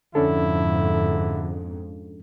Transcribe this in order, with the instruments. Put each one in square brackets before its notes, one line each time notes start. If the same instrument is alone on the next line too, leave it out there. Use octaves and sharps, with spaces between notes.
[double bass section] F2 G#2 [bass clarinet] D3 [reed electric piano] C#4 D4 A4 [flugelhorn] E4